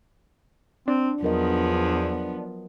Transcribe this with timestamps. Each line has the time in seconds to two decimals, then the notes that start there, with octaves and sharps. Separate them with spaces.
0.88 C4 D4
1.23 E2 F3 F#3 B3 A#4 D#5